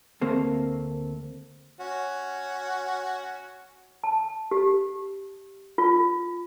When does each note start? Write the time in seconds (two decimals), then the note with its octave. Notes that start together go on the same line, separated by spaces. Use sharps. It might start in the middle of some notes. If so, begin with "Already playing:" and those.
0.21 D2 A3 A#3 C4
1.80 C#4 F#4
4.04 A5
4.51 G4
5.78 F4